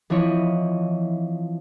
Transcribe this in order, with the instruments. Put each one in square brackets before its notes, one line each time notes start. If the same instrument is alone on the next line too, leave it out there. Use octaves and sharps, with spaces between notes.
[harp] E3 F3 C4 E4 C#5 D#5